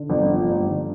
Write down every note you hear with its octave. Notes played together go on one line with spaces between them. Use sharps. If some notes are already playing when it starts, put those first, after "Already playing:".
Already playing: D3
G1
F3
G2
D3